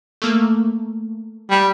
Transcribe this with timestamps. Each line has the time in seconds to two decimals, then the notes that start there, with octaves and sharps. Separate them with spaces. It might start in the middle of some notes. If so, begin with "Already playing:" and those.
0.22 A3 A#3
1.51 G3